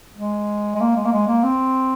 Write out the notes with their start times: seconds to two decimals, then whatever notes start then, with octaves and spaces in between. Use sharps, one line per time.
0.17 G#3
0.75 G#3
0.81 A#3
0.96 G#3
1.05 A#3
1.12 G#3
1.28 A#3
1.44 C4